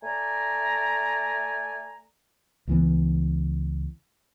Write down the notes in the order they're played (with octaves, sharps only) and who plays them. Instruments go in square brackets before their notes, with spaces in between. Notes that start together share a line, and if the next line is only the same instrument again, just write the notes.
[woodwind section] A3 D5 G#5 A#5
[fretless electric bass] C#2 E3 B3